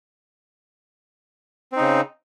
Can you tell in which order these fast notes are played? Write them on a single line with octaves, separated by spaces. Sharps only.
C4 D#4 C#3